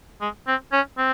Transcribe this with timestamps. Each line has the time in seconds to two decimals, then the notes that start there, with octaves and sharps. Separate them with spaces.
0.21 G#3
0.47 C4
0.73 C#4
0.98 C4